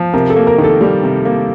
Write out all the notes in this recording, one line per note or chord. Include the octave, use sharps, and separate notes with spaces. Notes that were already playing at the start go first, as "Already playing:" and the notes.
Already playing: F3
C3 A#4
A4
A#3
A#4
D#3
A4
G3
C3
A#3